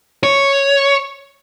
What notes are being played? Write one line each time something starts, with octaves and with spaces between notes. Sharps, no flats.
C#5